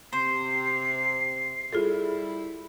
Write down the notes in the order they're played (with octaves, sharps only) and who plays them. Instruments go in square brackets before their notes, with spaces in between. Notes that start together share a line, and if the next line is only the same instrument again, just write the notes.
[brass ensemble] C3 [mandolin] C5 [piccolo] C7
[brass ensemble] G3 E4 [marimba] F4 G#4 A4